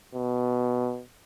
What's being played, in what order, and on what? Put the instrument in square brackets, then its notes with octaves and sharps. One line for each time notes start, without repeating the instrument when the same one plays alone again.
[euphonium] B2